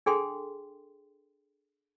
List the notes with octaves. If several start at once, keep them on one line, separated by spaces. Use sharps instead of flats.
D4 G#4 A4 G5 C6